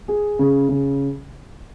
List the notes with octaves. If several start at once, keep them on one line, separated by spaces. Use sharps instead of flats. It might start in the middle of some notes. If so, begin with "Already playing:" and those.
G#4
C#3
C#3